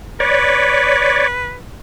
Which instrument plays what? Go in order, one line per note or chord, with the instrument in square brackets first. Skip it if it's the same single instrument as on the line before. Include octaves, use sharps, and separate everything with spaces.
[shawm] B4 [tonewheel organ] C#5 D5